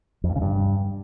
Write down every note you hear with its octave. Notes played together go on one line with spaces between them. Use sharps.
F2
G2
C#3
G2